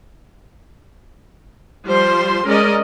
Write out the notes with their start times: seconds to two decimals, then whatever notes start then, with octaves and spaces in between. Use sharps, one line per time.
1.87 F3 G3 C5 C6
2.47 G#3 C#4 A#4 D5 D#5